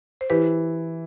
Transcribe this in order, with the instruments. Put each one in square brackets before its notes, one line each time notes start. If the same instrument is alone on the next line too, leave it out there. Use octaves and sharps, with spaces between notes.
[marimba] C5
[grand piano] E3 [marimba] G4 B4